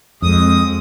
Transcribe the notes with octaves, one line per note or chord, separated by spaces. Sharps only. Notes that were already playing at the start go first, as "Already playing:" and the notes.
F2 G#3 D#6